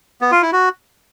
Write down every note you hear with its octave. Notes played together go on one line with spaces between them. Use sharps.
B3
F4
E4
F#4